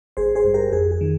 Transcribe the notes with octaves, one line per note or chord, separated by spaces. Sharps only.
G#1 G#4 C5
G#4 C5
G2
G4 A#4
F2 G#4
G#4
D#3